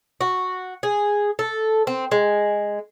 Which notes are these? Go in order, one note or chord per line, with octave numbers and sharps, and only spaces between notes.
F#4
G#4
A4
C4
G#3